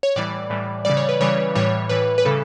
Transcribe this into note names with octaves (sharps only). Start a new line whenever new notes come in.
C#5
A2 E3 G3 D5
A2 E3 G3
C#3 E3 G3 D5
C#5
B4
C#3 E3 G3 C#5
A2 E3 G3 C#5
A2 E3 G3 B4
B4
C#3 E3 G3 A4